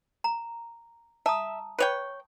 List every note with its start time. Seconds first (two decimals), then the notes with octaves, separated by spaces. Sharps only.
0.24 A#5
1.26 E5 A5 A#5 D#6
1.79 B4 C#5 G5